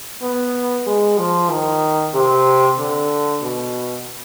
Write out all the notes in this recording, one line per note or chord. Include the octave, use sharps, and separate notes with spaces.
B3
G#3
F3
D#3
C3
D3
B2